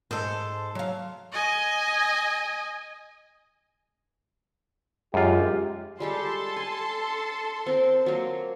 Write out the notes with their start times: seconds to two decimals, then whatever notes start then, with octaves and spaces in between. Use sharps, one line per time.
0.11 G#2 A4 C5
0.75 F#3 F5
1.32 D#5 G#5
5.14 F#2 G#3 F4 G4
6.00 G3 G#3 G4 A4 A5 C6
6.56 G#5
7.66 C4 A#4
8.06 F#3 A#3